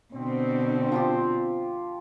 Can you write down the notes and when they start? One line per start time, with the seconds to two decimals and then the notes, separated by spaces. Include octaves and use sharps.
0.14 B2 D3 C4
0.92 F3 F4 G4